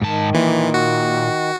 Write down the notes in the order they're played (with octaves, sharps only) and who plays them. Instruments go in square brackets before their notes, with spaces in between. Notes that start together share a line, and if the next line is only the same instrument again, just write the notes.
[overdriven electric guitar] G#2 A5 [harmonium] D#3
[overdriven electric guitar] A#2 [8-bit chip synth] E3
[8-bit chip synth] F#4